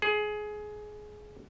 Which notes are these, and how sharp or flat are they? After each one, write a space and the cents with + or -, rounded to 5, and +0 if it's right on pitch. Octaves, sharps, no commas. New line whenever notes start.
G#4 +20